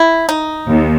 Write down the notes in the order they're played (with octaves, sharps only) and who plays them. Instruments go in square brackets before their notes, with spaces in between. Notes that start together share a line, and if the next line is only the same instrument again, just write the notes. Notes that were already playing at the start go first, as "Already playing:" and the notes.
Already playing: [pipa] E4
D#4
[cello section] D#2